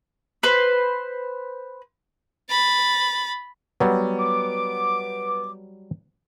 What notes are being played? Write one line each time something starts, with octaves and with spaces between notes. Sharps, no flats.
B4 C5
B5 A6
F#3 G3 B3
D6